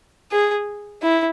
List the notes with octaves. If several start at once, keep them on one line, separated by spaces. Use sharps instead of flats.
G#4
E4